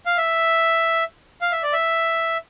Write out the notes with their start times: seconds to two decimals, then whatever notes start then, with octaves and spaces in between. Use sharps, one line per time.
0.06 F5
0.17 E5
1.41 F5
1.52 E5
1.63 D5
1.73 E5